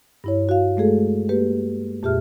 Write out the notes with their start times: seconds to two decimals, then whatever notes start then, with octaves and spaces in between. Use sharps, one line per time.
0.24 G2 E4 C#5
0.49 F#4 F5
0.77 G#3 A3 G#4 A4
1.29 A#3 G4 B4
2.03 F2 A#2 G4 G#4 E5 F6